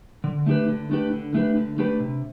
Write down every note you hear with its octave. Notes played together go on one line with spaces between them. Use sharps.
D3
A3 D4 G4 B4
D3
A3 D4 G4 B4
D3
A3 D4 G4 B4
D3
A3 D4 G4 B4
C3